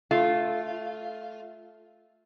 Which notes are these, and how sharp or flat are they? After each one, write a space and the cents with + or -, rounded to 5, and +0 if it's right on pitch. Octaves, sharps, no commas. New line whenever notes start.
A3 -10 F4 +0